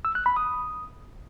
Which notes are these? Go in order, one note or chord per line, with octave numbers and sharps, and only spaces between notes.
E6
F#6
B5
D#6